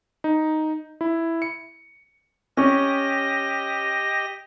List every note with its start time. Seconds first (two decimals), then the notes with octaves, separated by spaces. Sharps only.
0.24 D#4
1.01 E4
1.42 C#7
2.57 C#4 G4 D#5 A#6